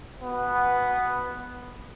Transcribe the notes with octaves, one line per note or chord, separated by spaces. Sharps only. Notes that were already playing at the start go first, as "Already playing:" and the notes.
B2 B3